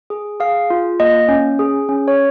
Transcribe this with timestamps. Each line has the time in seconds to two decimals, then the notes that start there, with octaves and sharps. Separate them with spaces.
0.10 G#4
0.40 G#4 F5
0.70 F4
1.00 A#3 D#5
1.29 C#4
1.59 G#4
1.89 C#4
2.08 C#5